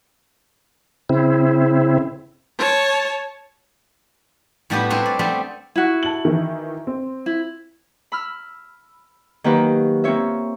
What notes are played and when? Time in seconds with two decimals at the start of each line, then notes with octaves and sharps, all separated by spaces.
1.09 C#3 C4 E4
2.58 C#5 A5
4.70 A2 G3 B3 D4 F#4 G4
4.90 G3 C4 D4 B4 C#5
5.06 D5
5.19 G3 A3 B3 C4
5.76 E4 F#4
6.03 A5 F#7
6.25 D#3 E3
6.87 C4
7.26 E4
8.12 B5 E6 F6
9.44 D#3 F#3 A#3 G4 B4
10.04 A#3 C4 F4 C#5 E5